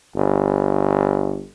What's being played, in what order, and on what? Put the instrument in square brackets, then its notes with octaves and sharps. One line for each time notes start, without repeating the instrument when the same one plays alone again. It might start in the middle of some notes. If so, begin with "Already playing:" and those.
[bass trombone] G1